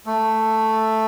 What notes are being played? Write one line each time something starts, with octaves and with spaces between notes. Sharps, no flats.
A3